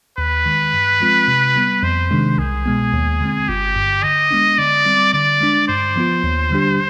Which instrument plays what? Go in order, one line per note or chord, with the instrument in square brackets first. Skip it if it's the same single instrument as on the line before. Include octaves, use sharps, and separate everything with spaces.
[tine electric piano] D#2 [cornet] B4
[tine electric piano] D#3 G#3
G2
F3 G#3 C4 F4
C3
G3 B3
[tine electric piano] F2 [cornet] C5
[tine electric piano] C3 D#3 G#3 D4
[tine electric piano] C2 [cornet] G#4
[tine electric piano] B2 G#3 B3
D#2
D3 G#3 C4
[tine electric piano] G1 [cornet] G4
[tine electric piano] G2 D3
[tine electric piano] D3 [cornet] D#5
[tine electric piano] G#3 B3 D4
[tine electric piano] D3 [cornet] D5
[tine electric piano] G3 C4
[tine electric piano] D3 [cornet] D5
[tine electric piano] G#3 D4
[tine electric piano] G2 [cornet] C5
[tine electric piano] F3 B3 F4
D#2
D3 G3 D4 G4